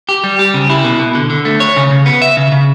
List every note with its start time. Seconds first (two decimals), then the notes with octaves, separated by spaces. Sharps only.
0.09 G4
0.24 G3
0.39 G4
0.54 C#3
0.70 E4
0.84 B2
0.99 B2
1.15 D3
1.30 D3
1.45 A3
1.60 C#5
1.76 C#3
1.91 C#3
2.06 B3
2.22 E5
2.37 C#3
2.52 C#3